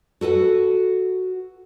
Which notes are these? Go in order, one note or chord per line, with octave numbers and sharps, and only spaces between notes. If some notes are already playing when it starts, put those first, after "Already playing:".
F#4 A4 B4 F#5